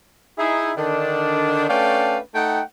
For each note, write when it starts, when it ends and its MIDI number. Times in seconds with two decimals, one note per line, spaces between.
0.39 0.73 63
0.39 0.73 64
0.39 0.73 68
0.77 1.69 50
0.77 1.69 51
0.77 1.69 62
1.70 2.19 57
1.70 2.19 61
1.70 2.19 62
1.70 2.19 71
1.70 2.19 77
1.70 2.19 79
2.35 2.62 57
2.35 2.62 63
2.35 2.62 78
2.35 2.62 79